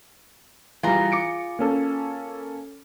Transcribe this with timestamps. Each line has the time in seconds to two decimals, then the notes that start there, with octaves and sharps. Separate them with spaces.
0.83 E3 G3 F4 G#4 A#5
1.12 D6 C#7 D7
1.59 A#3 C#4 A4